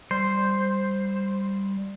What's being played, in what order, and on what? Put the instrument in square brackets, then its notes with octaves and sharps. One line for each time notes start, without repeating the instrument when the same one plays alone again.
[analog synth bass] G3 [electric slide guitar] C5